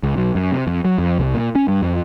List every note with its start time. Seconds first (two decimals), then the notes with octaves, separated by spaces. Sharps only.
0.03 C#2
0.17 B1
0.35 F#2
0.52 C3
0.67 F2
0.85 F#3
0.98 F2
1.19 C2
1.34 A#2
1.55 C#4
1.68 G2
1.82 F2